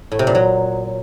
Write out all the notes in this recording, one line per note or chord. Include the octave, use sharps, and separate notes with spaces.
A2
C3
A#2
F#3